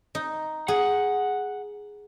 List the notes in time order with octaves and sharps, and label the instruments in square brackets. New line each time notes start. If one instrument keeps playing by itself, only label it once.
[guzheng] D#4
[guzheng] G#4 [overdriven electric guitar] F#5